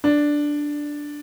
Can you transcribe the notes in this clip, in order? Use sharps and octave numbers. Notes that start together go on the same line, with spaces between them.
D4